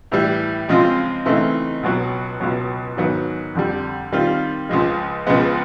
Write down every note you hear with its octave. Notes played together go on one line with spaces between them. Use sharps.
A2 E3 G3
C#3 F3 G#3 C4 F4
C#3 E3 A3 C4 D#4
C#2 B2 F#3
C#2 B2 F#3
G#2 D#3 F#3 B3
F2 D3 G3
D#3 G3 C4 F4
C#2 C#3 F3 G#3
C#2 C#3 F3 G#3 B3